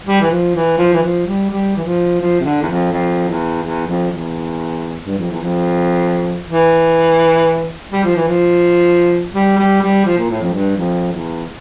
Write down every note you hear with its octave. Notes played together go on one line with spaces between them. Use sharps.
G3
E3
F3
E3
F3
E3
F3
G3
G3
E3
F3
F3
C3
D3
E2
F2
F2
E2
E2
F2
E2
G2
F2
E2
F2
E3
G3
F3
E3
F3
G3
G3
G3
F3
A#2
A2
F2
G2
F2
E2